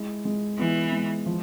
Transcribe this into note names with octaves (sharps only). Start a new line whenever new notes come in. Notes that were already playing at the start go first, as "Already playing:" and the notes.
Already playing: G#3 E4
G#3
E3 B3
G#3
F3